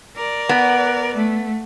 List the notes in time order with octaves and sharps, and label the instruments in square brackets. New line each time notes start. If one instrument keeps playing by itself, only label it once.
[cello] A#4 D5
[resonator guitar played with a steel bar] B3
[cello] A3